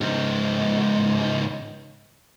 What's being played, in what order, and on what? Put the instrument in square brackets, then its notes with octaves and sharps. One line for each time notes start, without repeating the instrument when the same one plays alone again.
[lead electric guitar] C#2 G#2